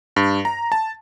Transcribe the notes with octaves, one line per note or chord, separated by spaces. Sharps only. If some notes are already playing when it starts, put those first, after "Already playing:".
G2
A#5
A5